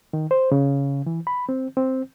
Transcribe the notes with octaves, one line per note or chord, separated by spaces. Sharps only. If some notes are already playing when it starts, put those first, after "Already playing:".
D#3
C5
C#3
E3
B5
C4
C4